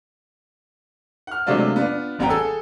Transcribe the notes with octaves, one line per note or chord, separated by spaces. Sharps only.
F#5 F6
C3 F#3 G#3 A3 D4 F4
B3 D4 F4
D#1 A1 B3 F#5 G5 A#5
G#4 A4 E6